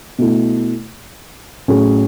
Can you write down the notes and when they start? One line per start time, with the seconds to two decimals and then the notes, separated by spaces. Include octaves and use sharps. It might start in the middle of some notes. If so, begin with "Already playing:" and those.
0.18 B2 A3 E4
1.68 A2 F#3 C#4 G#4